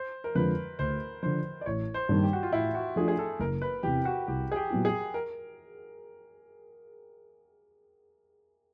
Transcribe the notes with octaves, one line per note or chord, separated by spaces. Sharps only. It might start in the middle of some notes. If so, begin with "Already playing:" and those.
Already playing: C5
A#4
F2 D3 F3 G#3 B4
D2 C5
D3 F3 C5
D5
A1 C#5
C5
G2 D#3 G3 A#3
G4
F#4
F4
A2 E4
F#4
F3 A3 D4 F4 G#4
G#4
A4
F#1 A#4
B4
E2 C3 E3 G4
F#4
C2 G4
G#4
G4
A#2 F#3 B3 E4
G#4
A#4